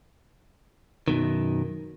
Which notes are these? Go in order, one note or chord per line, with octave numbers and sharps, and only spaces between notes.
F#2 B2 D#3